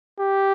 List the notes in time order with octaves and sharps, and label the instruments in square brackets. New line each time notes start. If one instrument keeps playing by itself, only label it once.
[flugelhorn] G4